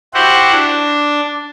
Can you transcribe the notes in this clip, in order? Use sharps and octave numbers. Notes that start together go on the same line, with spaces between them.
E4 F#4 G4 C5 F#5
D4